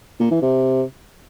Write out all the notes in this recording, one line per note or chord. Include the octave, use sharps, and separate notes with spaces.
A#2
E3
C3